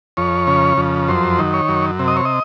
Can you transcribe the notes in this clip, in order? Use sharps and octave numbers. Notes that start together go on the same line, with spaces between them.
F2 C#5
C#3
F2
F#2 C5
D#3
C#5
F#2
C3
D#5
C#5
D#5